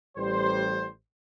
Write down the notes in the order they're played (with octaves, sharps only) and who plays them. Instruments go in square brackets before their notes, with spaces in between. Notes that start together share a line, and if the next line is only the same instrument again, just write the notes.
[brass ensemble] A1 G3 C5